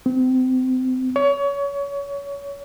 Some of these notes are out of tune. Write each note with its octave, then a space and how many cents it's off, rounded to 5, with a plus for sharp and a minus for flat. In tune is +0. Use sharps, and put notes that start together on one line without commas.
C4 -30
C#5 +30